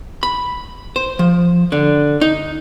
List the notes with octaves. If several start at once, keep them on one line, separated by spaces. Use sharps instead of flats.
B5
C5
F3
D3
D#4